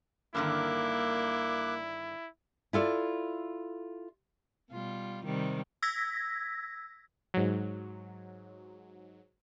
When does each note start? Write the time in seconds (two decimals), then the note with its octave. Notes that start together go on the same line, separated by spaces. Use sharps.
0.35 G2 D3 D#3 A#3 E4 D6 F#6
2.73 E4 F4 A4 D5
4.71 B2 G3 F4
5.25 C3 D#3 G3
5.82 E6 G#6 A#6 B6
7.34 G#2 F#3